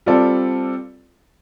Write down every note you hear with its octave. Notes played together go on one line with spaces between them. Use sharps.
G3 C4 F4 A4 D5